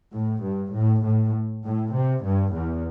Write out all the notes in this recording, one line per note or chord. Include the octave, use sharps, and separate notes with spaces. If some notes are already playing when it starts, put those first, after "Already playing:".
A2
G2
A2
A2
A2
C3
G2
E2